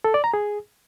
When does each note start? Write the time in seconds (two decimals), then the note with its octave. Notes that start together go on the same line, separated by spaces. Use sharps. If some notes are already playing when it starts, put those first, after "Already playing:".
0.04 A4
0.14 D5
0.24 A#5
0.34 G#4